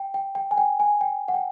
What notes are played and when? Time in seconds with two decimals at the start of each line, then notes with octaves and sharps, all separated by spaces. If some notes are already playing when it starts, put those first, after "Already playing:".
Already playing: G5
0.14 G5
0.35 G5
0.51 G#5
0.58 G5
0.80 G#5
1.01 G5
1.28 F#5
1.34 G5